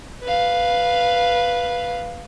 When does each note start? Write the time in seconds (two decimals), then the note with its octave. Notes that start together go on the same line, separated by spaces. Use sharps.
0.23 B4 F5